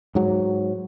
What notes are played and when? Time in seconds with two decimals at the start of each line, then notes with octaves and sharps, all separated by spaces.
0.15 G#2 F#3